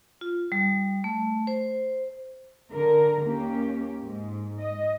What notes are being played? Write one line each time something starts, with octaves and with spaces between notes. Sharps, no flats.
F4
G3
A3
C5
D3 A#4
D#2 A#3 C#4 G4
G#2
D#5